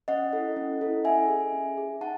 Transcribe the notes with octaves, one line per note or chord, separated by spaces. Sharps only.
C#4 D#5 F#5
E4 A4
C#4
E4 A4
C#4 E5 G#5
G#4
C#4
G#4
D#4 F#5 A5